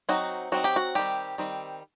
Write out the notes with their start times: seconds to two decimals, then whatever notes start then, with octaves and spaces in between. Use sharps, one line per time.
0.09 F#3 C4 D#4 F#4
0.52 F#3 C4 D#4 F#4
0.64 G4
0.76 F#4
0.95 D#3 G3 C4 G4
1.38 D#3 G3 C4